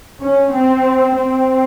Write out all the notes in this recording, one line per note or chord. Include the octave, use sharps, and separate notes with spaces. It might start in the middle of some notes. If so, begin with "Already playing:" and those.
C#4
C4
C4